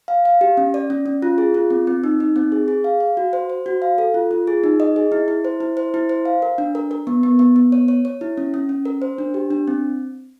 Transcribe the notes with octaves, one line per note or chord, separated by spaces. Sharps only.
F5
F5
G4
C#4
D5
C#4
C#4
F4
G#4
F4
C4
C4
D#4
D#4
C4
G#4
G#4
F5
F5
F#4
C5
C5
F#4
F5
A4
F4
F4
G#4
D#4
D#5
G#4
E4
E4
C5
E4
C5
E4
C5
F5
A#4
D4
A#4
A#4
B3
B3
B3
B3
C#5
C#5
C#5
E4
C#4
C#4
C#4
A#4
C5
D4
G4
D4
C4